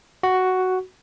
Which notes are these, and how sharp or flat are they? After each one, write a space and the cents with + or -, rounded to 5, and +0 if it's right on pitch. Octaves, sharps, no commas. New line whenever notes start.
F#4 +5